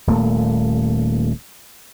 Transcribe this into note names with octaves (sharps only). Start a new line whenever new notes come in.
D#1 A#2 A3 A#3